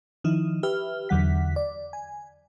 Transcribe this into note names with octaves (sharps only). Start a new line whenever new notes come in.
D#3 F3 D#4 E4
G4 B4 E5 F6
E2 D3 F#3 F#5 B6
D5
G#5